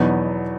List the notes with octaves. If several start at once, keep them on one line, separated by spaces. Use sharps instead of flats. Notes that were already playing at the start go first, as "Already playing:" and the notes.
Already playing: E2 B2 F#3 B3 D#4